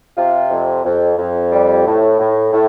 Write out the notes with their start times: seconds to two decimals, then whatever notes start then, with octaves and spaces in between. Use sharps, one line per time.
0.17 C3 F4
0.50 F2
0.85 F2
1.18 F2
1.52 G3
1.86 A2
2.19 A2
2.52 A2